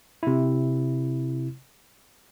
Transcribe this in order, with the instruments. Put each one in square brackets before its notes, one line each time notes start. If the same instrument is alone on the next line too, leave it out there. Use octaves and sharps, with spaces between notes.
[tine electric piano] C3 E4